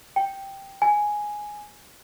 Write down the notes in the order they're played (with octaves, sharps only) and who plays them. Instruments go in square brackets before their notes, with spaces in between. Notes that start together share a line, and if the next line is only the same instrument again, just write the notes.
[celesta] G5
G#5